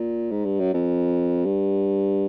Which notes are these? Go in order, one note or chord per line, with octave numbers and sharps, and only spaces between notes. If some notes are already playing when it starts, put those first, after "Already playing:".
Already playing: A#2
G#2
G2
F#2
F2
G2